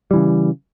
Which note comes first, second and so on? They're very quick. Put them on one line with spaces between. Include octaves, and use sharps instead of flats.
G3 E3 C#3